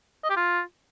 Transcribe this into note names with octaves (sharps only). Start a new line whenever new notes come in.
D#5
G4
F4